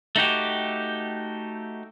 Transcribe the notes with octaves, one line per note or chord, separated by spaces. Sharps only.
A3 D#4 F#4 G4